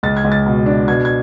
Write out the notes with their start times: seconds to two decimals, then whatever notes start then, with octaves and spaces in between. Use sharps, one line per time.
0.03 C#2 A6
0.17 G#6
0.25 C#2
0.32 A6
0.46 B2
0.66 D4
0.88 B2 G#6
1.05 G#6